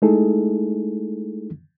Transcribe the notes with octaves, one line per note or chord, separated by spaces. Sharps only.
G#3 A3 D#4 E4 G#4 A4